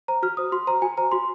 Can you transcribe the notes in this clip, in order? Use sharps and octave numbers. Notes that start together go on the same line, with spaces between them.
C5 A#5
F#4 F6
C5 D#6
F#4 C6
C5 A#5
F#4 G#5
C5 A#5
F#4 C6